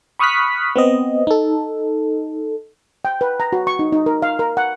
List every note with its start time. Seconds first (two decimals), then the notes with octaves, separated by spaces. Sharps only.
0.19 B5 C#6 D#6 F6 F#6 B6
0.76 B3 C4 D#5
1.27 D#4 A4
3.05 G5
3.21 B4
3.40 A#5
3.53 F#4
3.67 C#6
3.79 D#4
3.93 D#4
4.06 A#4
4.22 F5
4.39 A#4
4.57 F#5